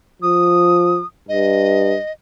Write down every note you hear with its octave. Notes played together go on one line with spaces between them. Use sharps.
F3 D#6
G2 D#5